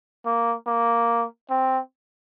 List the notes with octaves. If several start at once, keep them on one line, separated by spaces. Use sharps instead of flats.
A#3
A#3
C4